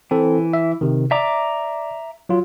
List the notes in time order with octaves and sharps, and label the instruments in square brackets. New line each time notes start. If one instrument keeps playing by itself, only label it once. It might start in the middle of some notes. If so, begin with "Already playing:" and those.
[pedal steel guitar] E3 [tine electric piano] C4 A4
[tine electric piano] E5
C3 D#3
[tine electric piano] D5 [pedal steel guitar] E5 A#5 D6
[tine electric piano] F#3 F4